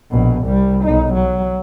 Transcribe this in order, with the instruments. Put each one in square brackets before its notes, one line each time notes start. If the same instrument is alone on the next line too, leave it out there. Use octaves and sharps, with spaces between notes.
[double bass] A#1 B2
C2 G3
B1 D#4
F#3